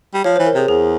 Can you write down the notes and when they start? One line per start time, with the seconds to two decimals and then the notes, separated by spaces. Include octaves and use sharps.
0.14 G3
0.24 F3 C#5
0.36 C5
0.39 E3
0.46 A#4
0.54 C3 G#4
0.68 E2 G#4